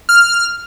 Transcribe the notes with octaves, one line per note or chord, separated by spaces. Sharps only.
F6